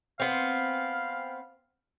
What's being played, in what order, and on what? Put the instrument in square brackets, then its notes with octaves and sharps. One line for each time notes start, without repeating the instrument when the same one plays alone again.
[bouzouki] B3 C4 [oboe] F5